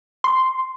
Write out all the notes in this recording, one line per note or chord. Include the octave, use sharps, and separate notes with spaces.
C6